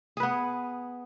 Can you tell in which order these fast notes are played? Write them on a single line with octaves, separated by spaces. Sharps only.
G#4 B4 B3